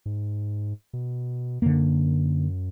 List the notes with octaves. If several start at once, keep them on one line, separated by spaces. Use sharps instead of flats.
G#2
B2
F#2 D3 A#3